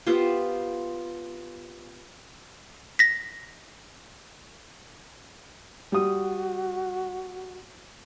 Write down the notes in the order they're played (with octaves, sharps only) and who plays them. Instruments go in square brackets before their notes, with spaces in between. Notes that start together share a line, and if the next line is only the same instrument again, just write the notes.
[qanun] B3 F4 G4 C5
[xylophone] A#6 B6
[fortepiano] G3 D#6 [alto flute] F#4